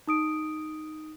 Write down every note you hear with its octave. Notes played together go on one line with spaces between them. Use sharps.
D#4 D#6 D7